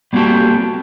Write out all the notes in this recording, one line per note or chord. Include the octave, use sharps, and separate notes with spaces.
G3 A#3 C4 F#4 G4 A4